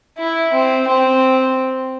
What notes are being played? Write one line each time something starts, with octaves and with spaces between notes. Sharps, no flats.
E4
C4
C4